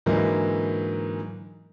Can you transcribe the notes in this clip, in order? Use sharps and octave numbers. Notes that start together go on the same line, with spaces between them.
G#2 D3 E3 F#3 A#3